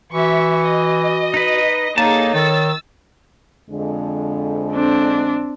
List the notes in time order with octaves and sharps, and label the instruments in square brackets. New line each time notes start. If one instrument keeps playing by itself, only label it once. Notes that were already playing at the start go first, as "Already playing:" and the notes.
[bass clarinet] E3 [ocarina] F#4 [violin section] E5 C#6
[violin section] D#5
[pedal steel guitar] D#4 B4
[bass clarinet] A#3 [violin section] D#4 G#4 A6 [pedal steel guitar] A4 A5 [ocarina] C#5
[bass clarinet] D#3 [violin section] E6 A6
[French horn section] F2 D3 G#3
[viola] C4 D4